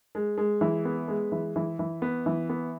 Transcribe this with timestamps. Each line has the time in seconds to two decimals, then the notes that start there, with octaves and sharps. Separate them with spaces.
0.15 G#3
0.38 G#3
0.61 E3
0.85 B3
1.08 G#3
1.32 E3
1.56 E3
1.79 E3
2.02 B3
2.26 E3
2.50 B3